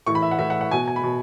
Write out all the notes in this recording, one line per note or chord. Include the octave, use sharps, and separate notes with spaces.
A2 E3 C#6
B5
E5
F#5
A2 E3 E5
F#5
F#5
B2 G#5
G#5
B5
B2